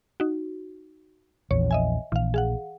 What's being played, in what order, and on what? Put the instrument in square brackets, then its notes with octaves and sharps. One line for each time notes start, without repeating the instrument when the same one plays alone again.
[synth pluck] D#4 F#4
[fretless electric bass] A#1 E2 [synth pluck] C#5
[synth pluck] D#5 E5 G#5
[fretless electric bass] A#1 [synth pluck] E3 F5
[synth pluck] G#4 F5 F#5